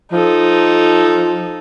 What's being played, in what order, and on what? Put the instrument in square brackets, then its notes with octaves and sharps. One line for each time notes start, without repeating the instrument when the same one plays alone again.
[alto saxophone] F3 [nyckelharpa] D#4 A4